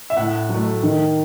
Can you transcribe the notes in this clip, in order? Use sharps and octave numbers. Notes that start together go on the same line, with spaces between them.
E5
A2 F#5
F#3
A3
D#3